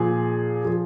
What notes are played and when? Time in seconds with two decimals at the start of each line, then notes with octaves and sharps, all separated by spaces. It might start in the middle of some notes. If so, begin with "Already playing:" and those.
Already playing: A#2 F3 G#4
0.65 F3